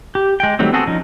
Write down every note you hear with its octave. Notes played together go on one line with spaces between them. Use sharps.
G4
G#3 G5
D#3 F#3 G3 A3 C4
B3 C4 F#4 G#4 A4
F3 C#4 D#4